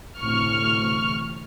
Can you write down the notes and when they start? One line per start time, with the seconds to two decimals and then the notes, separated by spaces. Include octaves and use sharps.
0.19 A1 D2 C3 C#6 F6